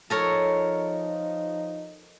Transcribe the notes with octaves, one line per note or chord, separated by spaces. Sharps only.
F3 D#4 A4 A#4 C#5